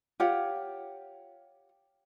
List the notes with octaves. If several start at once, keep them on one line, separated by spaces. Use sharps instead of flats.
F4 G4 C#5 F#5